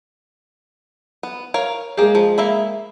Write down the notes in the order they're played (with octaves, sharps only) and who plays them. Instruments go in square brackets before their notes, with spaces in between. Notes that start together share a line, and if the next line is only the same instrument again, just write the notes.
[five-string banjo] B3
A#4 C#5 F5
[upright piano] G#3 G#4 [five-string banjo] A#3 G4
[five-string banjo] F3
A#3 E5 B5